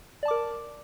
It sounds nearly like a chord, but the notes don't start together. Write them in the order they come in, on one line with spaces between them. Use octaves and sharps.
D5 A5 D6 A#4